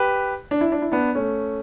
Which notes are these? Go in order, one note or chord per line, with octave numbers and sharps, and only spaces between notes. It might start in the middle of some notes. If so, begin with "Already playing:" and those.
Already playing: G4 B4
D4
E4
D4
E4
B3 D4
A3 C#4